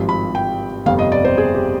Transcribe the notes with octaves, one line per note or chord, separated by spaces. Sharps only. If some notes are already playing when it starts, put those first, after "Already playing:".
Already playing: G#1 G2 F3
B5
G5
G1 F2 C3 F5
D#5
D5
C5
G#4
G4